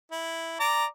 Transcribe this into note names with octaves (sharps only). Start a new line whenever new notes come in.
E4
D5 A#5 D6